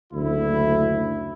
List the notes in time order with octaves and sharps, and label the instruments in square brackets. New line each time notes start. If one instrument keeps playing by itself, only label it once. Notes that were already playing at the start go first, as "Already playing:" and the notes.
[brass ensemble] F#1 D2 E4